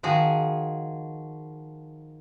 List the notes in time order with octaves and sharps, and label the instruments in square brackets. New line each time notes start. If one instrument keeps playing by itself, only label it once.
[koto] D#3 F3 F#4 G#4